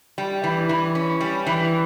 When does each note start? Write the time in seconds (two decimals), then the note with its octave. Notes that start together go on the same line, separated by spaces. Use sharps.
0.18 G3
0.44 E3
0.69 E3
0.95 C#4
1.21 G3
1.47 E3